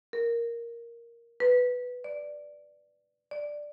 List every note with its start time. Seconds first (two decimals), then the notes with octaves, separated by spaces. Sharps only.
0.13 A#4
1.40 B4
2.04 D5
3.31 D5